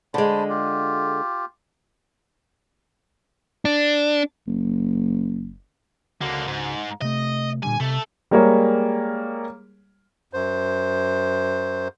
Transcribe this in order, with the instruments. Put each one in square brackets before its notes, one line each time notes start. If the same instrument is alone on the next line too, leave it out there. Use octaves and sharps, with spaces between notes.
[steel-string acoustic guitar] D3 G#3 [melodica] C5 A5 B5
[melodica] F4 G4
[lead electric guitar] D4
[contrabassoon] F#1
[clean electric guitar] C#2 F#4 F#5 [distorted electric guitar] D3 A#3
[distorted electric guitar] G#2
[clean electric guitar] C3 A3 [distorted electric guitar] D#5
[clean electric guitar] A#2 D3 G3 [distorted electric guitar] G#5
[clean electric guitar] C2 C3 A5 [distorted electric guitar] A3
[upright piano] G3 G#3 A#3 G#4 C#5
[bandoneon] F#2 C5